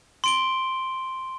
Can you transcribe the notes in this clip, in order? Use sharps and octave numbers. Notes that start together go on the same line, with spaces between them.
C6 D7 G7